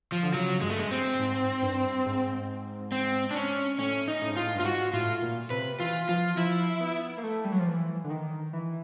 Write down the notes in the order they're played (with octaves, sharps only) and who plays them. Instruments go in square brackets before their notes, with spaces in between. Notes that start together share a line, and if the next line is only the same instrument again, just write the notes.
[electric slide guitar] F3
[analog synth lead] D3
[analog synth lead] C#3 [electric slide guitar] F#3
[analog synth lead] G2 [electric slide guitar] G#3
[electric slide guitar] A3
G#3
C4
[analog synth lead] G#2
G2
G#2
[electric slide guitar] C4
D4
C#4
[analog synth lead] A2 [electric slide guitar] C#4
[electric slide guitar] D#4
[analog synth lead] A2
G#2
[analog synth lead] A2 [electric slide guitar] F4
[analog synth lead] G2
[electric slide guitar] F4
[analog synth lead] G#2 [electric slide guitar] F#4
[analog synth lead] A2 [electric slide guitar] F4
[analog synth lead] A#2
[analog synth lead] C3 [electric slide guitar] B4
[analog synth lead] E3 [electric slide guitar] F4
[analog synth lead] F3 [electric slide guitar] F4
[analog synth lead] F3 [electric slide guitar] E4
[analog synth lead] B3
A#3
A3
G3
F#3
F3
E3
D3
D#3
E3